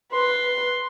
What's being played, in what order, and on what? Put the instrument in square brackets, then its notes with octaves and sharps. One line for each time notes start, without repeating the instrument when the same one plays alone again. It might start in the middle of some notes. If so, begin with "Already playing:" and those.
[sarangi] B4 [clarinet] C6